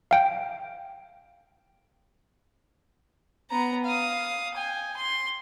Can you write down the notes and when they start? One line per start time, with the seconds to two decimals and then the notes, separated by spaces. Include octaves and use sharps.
0.11 F5 G5
3.51 B3 A#5
3.85 F5 D#6
4.55 G5 G#5
4.96 C6